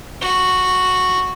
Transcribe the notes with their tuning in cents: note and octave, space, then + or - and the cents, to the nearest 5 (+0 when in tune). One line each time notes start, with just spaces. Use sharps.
F#4 -5